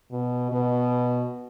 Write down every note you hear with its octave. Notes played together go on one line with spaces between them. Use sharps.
B2
B2